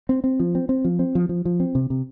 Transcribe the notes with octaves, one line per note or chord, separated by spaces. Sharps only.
C4
C4
F3
C4
C4
F3
C4
F3
F3
F3
C4
C3
C3